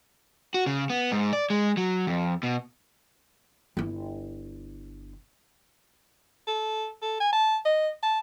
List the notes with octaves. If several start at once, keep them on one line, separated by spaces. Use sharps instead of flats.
F#4
C#3
B3
G#2
D5
G#3
F#3
F2
B2
G1 E4
A4
A4
G#5
A5
D#5
A5